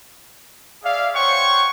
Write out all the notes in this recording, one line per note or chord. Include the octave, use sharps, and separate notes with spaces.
G#4 D5 E5 F5
C5 C#5 F#5 G5 C6 C#6